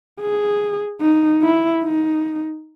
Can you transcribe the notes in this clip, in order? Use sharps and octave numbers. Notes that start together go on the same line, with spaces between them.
G#4
D#4
E4
D#4